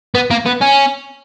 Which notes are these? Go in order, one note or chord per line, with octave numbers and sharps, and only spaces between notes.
B3
A#3
B3
C#4